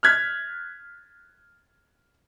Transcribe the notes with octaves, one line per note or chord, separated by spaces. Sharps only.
F6 F#6 G#6 B6